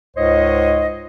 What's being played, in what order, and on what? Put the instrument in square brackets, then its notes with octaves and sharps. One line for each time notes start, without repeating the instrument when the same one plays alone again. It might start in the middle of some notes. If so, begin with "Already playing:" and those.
[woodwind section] C#2 G#2 C5 C#5 D#5